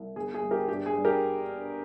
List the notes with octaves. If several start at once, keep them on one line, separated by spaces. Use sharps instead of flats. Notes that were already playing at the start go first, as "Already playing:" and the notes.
Already playing: C2
G1 G#4
G#4
G1
G4 A#4
G2 G4
G#4
G2
G4 A#4